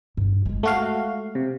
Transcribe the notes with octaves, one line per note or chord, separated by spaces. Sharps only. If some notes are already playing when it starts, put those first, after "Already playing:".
G2
G#3 F4
A3 F#4 F5
C3